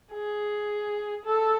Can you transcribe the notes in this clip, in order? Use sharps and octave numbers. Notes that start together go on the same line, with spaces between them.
G#4
A4